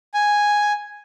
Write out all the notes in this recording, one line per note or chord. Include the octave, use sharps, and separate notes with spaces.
G#5